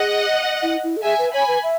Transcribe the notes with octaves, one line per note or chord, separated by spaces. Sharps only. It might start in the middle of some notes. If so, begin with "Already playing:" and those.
Already playing: G#4 D#5 F#5
E4
E4
A4
G#4 E5 G#5
B4
C#5 G#5 B5
B4
E5